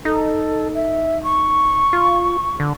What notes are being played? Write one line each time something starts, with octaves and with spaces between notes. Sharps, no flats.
D#4 A4
E5
C#6
F4
D3